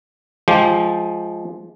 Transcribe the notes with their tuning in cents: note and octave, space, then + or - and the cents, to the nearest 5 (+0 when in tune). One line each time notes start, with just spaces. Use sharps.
F3 +0 G#3 +15 G4 +0